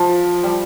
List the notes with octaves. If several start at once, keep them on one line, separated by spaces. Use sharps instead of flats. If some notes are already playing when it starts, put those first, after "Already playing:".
Already playing: F3
G3